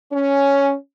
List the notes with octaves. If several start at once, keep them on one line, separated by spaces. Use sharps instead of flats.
C#4